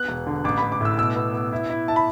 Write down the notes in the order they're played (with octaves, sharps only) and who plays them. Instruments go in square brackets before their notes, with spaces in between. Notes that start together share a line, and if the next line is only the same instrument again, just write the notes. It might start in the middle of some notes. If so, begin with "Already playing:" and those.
Already playing: [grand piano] B3 F#6
E1
D3
A1 D6
B5
A1
D6
A2 E6
B2 E6
B3
B3
E4
E4
E4 A5
B5